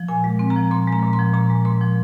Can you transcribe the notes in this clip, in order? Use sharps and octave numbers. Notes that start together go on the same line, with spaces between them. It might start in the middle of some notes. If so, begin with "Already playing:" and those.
Already playing: F3
A#2 G#5
G#3
C4
A#5
F3
A#2 C6
G#3
A#5
A#2
C6
F3
A#2 A#5
G#3
A#2 C6
F3